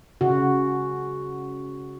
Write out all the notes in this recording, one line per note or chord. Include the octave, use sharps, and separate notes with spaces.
C#3 F#4